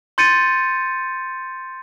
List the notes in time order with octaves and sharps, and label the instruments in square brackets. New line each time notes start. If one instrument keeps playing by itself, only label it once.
[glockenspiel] C6 G6 A6 C#7 D#7